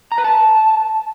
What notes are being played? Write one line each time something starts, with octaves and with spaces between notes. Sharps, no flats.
A#5
B4
A5